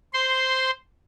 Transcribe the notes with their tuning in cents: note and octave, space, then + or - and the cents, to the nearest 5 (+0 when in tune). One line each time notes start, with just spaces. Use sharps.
C5 +0 C6 -10